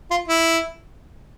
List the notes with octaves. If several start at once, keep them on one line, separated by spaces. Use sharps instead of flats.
F4
E4